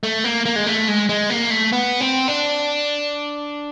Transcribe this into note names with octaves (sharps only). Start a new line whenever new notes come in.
A3
A#3
A#3
G#3
A3
G#3
G#3
A#3
A3
B3
C4
D4